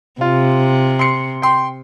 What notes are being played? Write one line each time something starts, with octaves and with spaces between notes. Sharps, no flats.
C3 F4
C6 C7 C#7
G5 C6